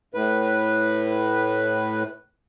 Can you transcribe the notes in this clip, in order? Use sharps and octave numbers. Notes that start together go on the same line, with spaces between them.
A2 B4